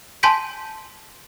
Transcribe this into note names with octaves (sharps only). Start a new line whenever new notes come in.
G#5 A5 C6 G6 B6 D7